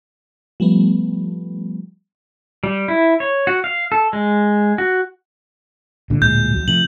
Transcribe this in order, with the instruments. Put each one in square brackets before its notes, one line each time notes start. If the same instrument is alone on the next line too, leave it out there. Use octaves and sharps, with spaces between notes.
[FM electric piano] F3 G3 A3 B3
[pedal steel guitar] G3
E4
C#5
F#4
F5
A4
G#3
F#4
[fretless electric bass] G2 A#2 D3
[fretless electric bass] D1 A#2 G#3 [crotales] G6
[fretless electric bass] D#2 F#3
[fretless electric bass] C3 F3 A3 [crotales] F#7